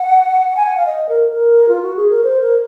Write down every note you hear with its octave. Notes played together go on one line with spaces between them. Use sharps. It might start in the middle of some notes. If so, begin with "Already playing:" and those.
Already playing: F#5
G#5
F#5
F5
D#5
A#4
A#4
F4
F#4
G#4
A#4
C5
A#4